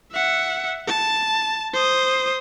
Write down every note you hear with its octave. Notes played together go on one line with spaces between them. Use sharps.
E5 F#5
A5
C5 D#6